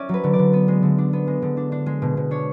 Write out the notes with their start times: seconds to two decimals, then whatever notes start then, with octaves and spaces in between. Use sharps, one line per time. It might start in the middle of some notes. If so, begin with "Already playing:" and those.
Already playing: C#4 D5 E5
0.09 F#3 B4
0.24 D3
0.33 D5
0.39 D3
0.53 B3
0.68 G#3
0.83 D3
0.98 D4
1.13 B3
1.27 G#3
1.42 D3
1.57 D4
1.72 D4
1.86 G#3
2.02 B2
2.17 B2
2.31 D4 C#5